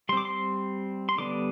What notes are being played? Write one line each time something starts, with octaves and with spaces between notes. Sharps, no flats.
G3 C4 C6 D6
C6
C6
D3 G3 B3 D4 D6